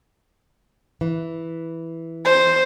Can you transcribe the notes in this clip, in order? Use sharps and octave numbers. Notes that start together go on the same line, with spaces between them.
E3
C5